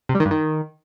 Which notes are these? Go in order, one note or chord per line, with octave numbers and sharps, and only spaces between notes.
C3
G3
D#3
G2
D#3